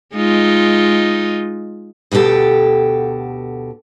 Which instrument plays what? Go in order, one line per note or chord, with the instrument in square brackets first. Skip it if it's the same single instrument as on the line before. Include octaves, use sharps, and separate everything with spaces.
[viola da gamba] G#3 D#4 F4
[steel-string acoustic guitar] D2 B2 F#4 G4 A4